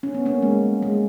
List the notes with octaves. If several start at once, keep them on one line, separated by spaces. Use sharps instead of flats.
C#4
B3
A#3 C#4
G#3
G#3